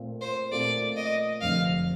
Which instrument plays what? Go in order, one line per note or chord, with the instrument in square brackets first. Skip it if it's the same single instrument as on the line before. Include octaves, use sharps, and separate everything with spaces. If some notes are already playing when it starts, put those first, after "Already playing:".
Already playing: [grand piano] A#2 A3 C4 F4
[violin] C5
[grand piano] A#2 A3 C4 F4 [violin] D5
[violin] D#5
[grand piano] F1 F2 D3 [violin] F5